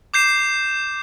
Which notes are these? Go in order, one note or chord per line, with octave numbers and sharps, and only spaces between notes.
D6 G6 C7 E7